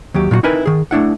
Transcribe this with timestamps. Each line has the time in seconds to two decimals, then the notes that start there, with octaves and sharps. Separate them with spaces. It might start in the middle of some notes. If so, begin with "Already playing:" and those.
0.14 D#2 F#3 G4
0.31 A#2 F#3 F4 F#4
0.43 C4 D#4 E4 A#4 B4 G#5
0.66 D#3 G#4
0.91 A3 D4 E4 F#5